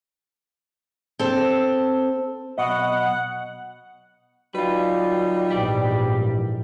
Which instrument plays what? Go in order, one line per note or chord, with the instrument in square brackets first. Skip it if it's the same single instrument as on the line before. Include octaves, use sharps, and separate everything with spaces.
[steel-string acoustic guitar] C4 A4
[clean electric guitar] B1 B2 D#5 [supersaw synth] F#5
[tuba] F#3 [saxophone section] G3 D#4 [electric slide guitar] F4 B4
[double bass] A#1 G#2 [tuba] E2 [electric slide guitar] G4 D5